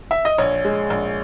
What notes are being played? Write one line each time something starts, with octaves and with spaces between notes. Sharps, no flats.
E5
D#5
A#1 C#5
G#3
A#1